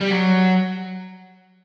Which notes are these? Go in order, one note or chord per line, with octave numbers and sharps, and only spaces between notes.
G3
F#3